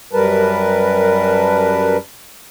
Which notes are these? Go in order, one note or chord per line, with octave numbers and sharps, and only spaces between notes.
F#2 G3 A#4 B4 A5